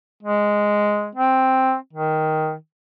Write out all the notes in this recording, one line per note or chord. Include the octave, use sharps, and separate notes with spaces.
G#3
C4
D#3